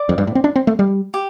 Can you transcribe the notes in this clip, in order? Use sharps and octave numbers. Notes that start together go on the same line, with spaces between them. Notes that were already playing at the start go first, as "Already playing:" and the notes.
Already playing: D5 D6
F2
G2
A2
C4
D4
C4
A3
G3
G4